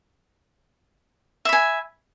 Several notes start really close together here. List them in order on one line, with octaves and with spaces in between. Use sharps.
E5 B5 G#5